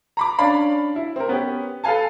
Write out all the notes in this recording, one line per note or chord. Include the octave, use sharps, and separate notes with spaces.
A#5 B5 D6
C#4 D4 D5 F5 B5
E4
C4 A#4
B3 C#4 G4
A4 B4 F5 G#5 A5